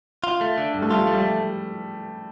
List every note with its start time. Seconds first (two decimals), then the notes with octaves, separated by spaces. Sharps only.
0.24 F4
0.41 A3
0.58 D3
0.74 G2
0.82 A3
0.90 G3 F4
1.07 A3
1.13 G3